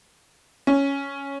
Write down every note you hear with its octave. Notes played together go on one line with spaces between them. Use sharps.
C#4